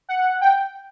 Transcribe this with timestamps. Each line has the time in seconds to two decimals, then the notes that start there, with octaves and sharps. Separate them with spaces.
0.09 F#5
0.41 G5